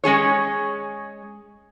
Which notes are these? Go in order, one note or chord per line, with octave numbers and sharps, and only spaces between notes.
G#3 C#4 G#4 C#5